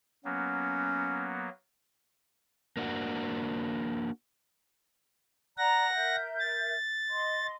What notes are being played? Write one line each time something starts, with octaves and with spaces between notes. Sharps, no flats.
F#3 A#3 B3 C#4
A#3 D4 F#4
D5 F#5 A#5 A#6
A#4 E5 G6
A6
D#5 C6